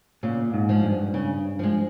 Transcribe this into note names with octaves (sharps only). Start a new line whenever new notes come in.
A#2 C#3
G#2
F3 G#3
G2
C#3
F3 G#3